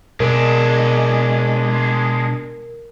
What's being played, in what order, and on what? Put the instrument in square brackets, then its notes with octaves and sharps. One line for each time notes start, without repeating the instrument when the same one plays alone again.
[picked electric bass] B2 [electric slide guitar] G#3 D4 [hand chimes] A#4